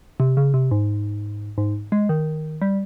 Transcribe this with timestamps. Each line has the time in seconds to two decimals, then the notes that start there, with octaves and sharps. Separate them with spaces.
0.20 C3
0.37 C#3
0.54 C3
0.71 G#2
1.58 G#2
1.92 G#3
2.09 D#3
2.62 G3